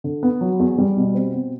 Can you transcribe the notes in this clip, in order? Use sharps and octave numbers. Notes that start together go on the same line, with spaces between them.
D3
B3
F#3
E2
G3
B2
C4
B2